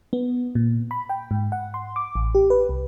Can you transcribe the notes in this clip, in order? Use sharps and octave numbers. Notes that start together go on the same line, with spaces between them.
B3
A#2
B5
G5
G#2
F#5
C6
D6
A1
G4
B4
C2